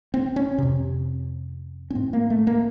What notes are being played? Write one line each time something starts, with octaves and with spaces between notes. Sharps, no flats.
C4
C#4
F2 C3
C#4
A2 C4
A#3
A3
A#3